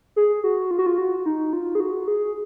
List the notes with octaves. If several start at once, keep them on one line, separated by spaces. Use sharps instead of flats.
G#4
F#4
F4
F#4
F4
F#4
D#4
F4
G#4
F#4
G#4